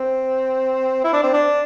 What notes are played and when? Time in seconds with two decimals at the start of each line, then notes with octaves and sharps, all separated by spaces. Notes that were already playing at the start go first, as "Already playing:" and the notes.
Already playing: C4
1.04 E4
1.13 D4
1.23 C4
1.33 D4